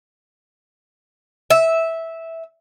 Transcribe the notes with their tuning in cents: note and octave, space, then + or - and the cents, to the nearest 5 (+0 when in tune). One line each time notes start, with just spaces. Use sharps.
E5 -10